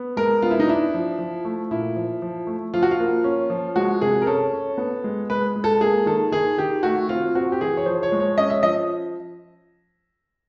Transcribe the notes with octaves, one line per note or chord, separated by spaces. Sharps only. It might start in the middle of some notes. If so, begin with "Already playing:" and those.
Already playing: B3
G#3 A#4
B3 F4
E4
D#4
D4 E4
F3
F3
A3
A#2 E4
F3
F3
A3
F3 F4
F#4
F4
A#3
C#4
F3
G#3 F#4
C3 G#4
A#4
C#4 A4
C#4
B3
G#3
G#3 B4
G#3
A4
A#3 G#4
D#3 A4
D#3 G#4
D#3 G4
A3 F#4
C4 F4
C4 F#4
G4
E3 G#4
C#5
F3 C5
C#5
G#3
C#5
C#4 D#5
E5
F3 D#5